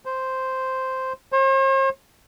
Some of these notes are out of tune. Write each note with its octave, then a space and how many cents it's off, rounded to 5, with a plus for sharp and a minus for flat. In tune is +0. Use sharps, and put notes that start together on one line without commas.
C5 -5
C5 +45